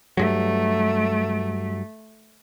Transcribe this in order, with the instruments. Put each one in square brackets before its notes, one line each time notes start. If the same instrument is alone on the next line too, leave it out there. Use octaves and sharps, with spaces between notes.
[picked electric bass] G2 F#3 [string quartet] A3